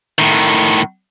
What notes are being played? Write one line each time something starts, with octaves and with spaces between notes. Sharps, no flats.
A2 D#3